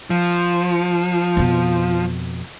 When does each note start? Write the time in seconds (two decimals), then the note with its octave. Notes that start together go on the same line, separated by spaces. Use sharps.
0.10 F3
1.37 F2 B2